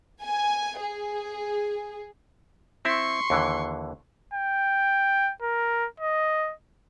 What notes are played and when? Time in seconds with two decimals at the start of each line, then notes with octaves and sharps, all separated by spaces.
0.22 G#5
0.80 G#4
2.85 C4 E4 E5 C6 C#6
3.30 D#2 D3 E3
4.34 G5
5.42 A#4
6.00 D#5